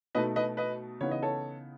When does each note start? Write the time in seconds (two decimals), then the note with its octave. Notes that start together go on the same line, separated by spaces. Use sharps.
0.15 B2 A3 D#4 B4 D#5
0.36 B4 D#5
0.57 B4 D#5
1.01 C#3 E3 B3 D#4 C#5
1.11 D#5
1.23 A4 C#5